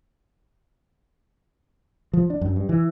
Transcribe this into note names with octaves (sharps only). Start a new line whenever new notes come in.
F3
D4
F#2
G2
E3